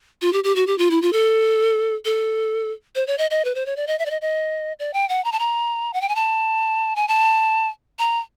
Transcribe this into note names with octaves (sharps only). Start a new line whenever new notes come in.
F4
G4
G4
F#4
G4
F4
E4
F4
A4
A4
C5
C#5
D#5
D#5
B4
C5
C#5
D5
D#5
E5
D5
D#5
D#5
D5
G5
F#5
A#5
A5
A#5
F#5
G5
G#5
A5
G#5
A5
A#5